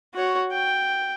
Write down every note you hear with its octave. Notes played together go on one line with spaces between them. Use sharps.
F#4 C#5
G5